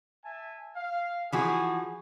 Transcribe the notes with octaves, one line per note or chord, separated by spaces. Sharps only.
E5 G#5 A5
F5
E3 F3 F#4 G#4